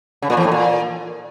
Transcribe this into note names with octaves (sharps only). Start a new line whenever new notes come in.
C#3
A#2
E2
A2
A#2